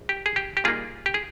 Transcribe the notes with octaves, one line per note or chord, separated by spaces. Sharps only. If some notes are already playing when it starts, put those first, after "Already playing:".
Already playing: A#1
G4
G#4
G4
G4
A#2 G3 A#3 D#4 F4 G#4
G4
G#4